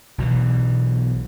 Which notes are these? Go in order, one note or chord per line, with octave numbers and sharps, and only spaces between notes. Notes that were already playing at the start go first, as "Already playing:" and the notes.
B1 B2 E3